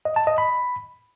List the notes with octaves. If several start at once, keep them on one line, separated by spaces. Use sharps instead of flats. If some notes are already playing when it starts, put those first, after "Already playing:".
D#5
A5
D#5
B5